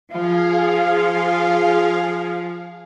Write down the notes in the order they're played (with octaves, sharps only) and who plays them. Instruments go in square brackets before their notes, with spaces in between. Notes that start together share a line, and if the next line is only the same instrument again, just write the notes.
[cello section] F3 [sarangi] F4 [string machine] G#4 F5